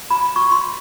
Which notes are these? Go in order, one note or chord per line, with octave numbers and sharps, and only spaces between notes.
B5
C#6
C6